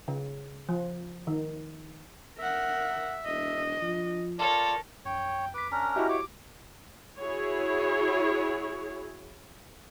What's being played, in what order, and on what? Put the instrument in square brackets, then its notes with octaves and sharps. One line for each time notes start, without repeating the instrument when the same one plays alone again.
[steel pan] C#3
F3
D#3
[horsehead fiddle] A#4 F#5 [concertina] E5
[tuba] E1 [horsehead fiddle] D4 D#5
[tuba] F3
[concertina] F4 D5 A5 [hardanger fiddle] A4 C#5 [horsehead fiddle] A#4
[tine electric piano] A#1 F#2 [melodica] C#5 [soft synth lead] G5
[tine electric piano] F2 B6 [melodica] B4 [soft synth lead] D6
[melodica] C#4 D4 A#4 [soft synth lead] A#5
[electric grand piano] E4 F#4 G4 [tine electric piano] D#5 E5
[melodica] C#5 [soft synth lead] D6
[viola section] E4 F#4 G#4 C#5